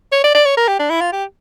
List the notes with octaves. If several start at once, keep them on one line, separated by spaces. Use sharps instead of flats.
C#5
D5
D5
C#5
A#4
G4
D4
E4
F4
G4